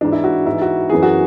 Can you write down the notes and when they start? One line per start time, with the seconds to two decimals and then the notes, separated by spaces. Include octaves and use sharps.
0.01 G#2 E3 D4
0.12 E4
0.24 F#4
0.46 G#2 E3 E4
0.62 F#4
0.90 F#2 E3 G#4
1.03 F#4